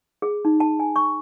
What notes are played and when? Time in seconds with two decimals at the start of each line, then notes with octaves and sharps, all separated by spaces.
0.22 G#4
0.45 D#4
0.60 A5
0.79 G#5
0.96 C#6